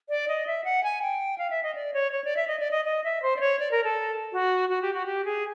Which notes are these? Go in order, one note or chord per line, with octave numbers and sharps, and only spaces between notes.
D5
D#5
E5
F#5
G#5
G5
F5
E5
D#5
D5
C#5
C#5
D5
E5
D#5
D5
D#5
D#5
E5
C5
D5
C#5
D5
A#4
A4
F#4
F#4
G4
F#4
G4
G#4